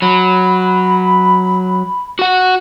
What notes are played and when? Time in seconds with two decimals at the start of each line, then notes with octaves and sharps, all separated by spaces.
0.02 F#3 B5
2.19 F#4 F#5